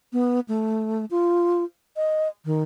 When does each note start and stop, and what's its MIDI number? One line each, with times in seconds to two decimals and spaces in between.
0.13 0.40 59
0.48 1.05 57
1.11 1.64 65
1.97 2.28 75
2.45 2.63 51